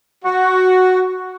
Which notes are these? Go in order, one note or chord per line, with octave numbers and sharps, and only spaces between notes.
F#4